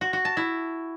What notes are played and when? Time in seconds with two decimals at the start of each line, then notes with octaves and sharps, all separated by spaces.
0.01 F#4
0.13 F#4
0.25 A5
0.37 E4